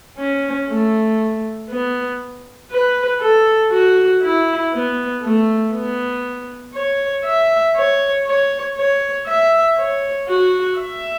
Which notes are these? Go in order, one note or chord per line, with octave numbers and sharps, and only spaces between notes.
C#4
A3
B3
B4
A4
F#4
E4
B3
A3
B3
C#5
E5
C#5
C#5
C#5
E5
C#5
F#4
E5